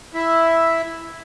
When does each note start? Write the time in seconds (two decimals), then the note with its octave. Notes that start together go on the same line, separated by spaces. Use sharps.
0.14 E4 E5